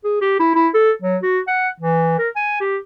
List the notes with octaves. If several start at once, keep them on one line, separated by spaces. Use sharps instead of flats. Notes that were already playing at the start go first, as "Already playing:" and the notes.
G#4
G4
E4
E4
A4
F#3
F#4
F#5
E3
A#4
G#5
G4